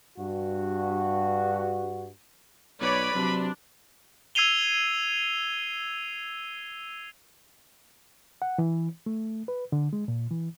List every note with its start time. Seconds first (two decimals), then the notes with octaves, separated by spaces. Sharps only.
0.18 G2 F#4
2.81 B1 B4 C#5 D5 B5
3.15 C3 F#3 D4
4.35 E6 G#6 C7 D#7 F7 G7
8.42 F#5
8.58 E3
9.06 A3
9.48 B4
9.72 D3
9.93 G#3
10.08 A#2
10.31 E3